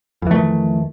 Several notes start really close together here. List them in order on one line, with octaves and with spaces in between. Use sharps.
F2 E3 A3 D#3